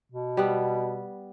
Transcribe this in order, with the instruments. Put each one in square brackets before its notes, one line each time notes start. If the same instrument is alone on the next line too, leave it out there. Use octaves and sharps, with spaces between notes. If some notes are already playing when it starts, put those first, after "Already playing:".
[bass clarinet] B2
[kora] G3 B3